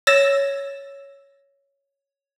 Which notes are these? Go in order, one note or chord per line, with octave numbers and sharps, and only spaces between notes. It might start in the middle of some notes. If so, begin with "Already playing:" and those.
C#5 E6 A6 A#6 E7